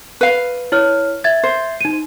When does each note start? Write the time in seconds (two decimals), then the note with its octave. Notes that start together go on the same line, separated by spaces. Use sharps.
0.21 B4 F5
0.72 E4 C#5 F6
1.24 E5 G#6 A6
1.43 C5
1.81 D#4 D#7